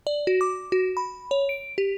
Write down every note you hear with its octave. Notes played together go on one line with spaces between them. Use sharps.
D5
F#4
D6
F#4
B5
C#5
D7
G4